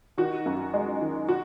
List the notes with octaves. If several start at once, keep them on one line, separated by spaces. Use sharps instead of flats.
D#3 F#4
F#2
G#3
D#3
F#4